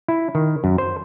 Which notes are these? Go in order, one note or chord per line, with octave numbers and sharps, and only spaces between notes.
E4
D#3
F#2
C5